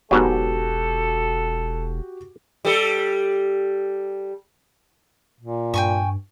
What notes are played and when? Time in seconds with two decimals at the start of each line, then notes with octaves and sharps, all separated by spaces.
0.11 E1 G#2 B2 F#3 F#4 G4 A4
2.65 G3 A4
5.41 A#2
5.74 G2 G5 G#5 C#6